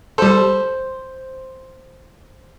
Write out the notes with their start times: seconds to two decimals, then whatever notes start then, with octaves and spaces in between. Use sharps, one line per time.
0.18 G3 A4 C5